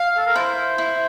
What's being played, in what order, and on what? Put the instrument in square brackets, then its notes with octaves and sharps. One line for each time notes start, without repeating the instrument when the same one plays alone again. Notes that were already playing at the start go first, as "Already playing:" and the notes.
Already playing: [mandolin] F5
[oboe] A4
A#4
[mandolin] E4 [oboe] C5
[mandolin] E4